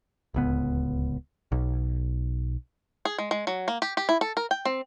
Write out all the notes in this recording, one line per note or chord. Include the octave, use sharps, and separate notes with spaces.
D1 C#2 B3
B1
G#4
G#3
G#3
F#3
A#3
G4
G4
E4
A4
A#4
G5
C4